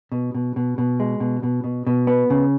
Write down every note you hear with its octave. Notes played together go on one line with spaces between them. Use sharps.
B2
B2
B2
B2
G#3
B2
B2
B2
B2
B3
C#3